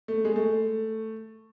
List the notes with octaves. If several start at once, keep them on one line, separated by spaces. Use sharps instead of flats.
A3
G#3
A3